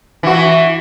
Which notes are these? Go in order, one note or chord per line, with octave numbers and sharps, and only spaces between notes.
E3 F#4